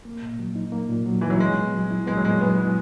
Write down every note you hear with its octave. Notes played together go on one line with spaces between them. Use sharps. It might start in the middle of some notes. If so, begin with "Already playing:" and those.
A#3
A#2
F#3
D#4
A#3
A#2
F#3
E3 D#4
F#3
G#3 B3
A#2
F#3
E4
G#3 B3
F#3
A#2 G#3
F#3 B3
G#3 E4